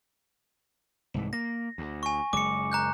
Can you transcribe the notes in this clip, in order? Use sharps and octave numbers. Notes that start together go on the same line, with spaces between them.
C2 G#2 E3
A#3 A#6
D2
G#5 C#6
F#1 G#3 D6 C#7
A#5 F#6 G6